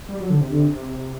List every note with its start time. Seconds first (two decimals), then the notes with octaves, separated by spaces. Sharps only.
0.09 G3
0.20 F#3
0.30 D3
0.41 C3
0.52 D3